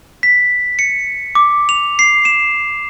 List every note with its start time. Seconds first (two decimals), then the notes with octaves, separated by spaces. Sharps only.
0.23 B6
0.79 C#7
1.35 D6
1.69 F7
1.99 C7
2.25 E7